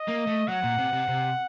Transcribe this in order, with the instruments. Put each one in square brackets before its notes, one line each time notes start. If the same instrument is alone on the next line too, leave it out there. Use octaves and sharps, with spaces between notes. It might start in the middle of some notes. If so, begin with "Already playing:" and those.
Already playing: [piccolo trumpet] D#5
[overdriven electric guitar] A#3
A3
[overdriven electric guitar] F#3 [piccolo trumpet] F#5
[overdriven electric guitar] A#2
C3
C3
C3